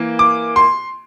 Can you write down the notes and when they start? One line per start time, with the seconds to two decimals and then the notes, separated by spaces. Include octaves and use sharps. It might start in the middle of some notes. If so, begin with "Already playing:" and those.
Already playing: E3 A#3
0.19 D6
0.56 C6